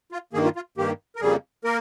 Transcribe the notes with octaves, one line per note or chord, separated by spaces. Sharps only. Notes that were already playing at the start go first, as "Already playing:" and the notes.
F4
G2 D#3 A#3 G#4
F4
F4
G2 D#3 A#3 G4
A#4
F2 C#3 G3 A#3 G#4
A#3 A#4